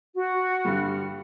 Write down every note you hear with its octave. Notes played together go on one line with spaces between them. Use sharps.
F#4
G2 D3 G3